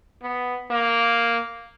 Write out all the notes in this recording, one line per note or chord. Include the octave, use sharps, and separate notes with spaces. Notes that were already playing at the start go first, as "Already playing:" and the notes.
B3
A#3